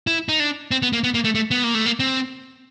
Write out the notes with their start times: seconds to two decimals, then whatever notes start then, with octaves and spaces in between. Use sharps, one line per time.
0.07 E4
0.29 D#4
0.40 D4
0.71 C4
0.82 B3
0.93 A#3
1.04 B3
1.14 A#3
1.24 A3
1.35 A3
1.51 B3
1.64 A#3
1.75 A3
1.86 A#3
2.00 C4